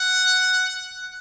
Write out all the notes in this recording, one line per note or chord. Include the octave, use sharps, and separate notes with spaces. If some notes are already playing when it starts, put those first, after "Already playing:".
Already playing: F#5